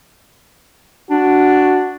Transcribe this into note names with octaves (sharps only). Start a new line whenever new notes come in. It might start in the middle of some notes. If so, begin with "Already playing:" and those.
D4 F#4